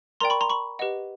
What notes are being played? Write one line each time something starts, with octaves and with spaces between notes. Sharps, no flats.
A#4 D5 G5 A#5 C6
B5 C#6
A#5 C6
B5 C#6
G4 B4 D#5 F#5